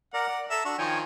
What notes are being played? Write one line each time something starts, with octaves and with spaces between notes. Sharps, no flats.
A#4 D5 F#5 A#5
D5
A4 E5 A#5
D4 F#4 C#6
D#3 F3 C#5 G5 G#5